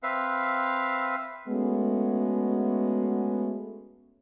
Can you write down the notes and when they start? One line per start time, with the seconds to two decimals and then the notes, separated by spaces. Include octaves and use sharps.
0.03 C4 B4 E5 F5
1.48 G#3 A3 B3 C#4 F#4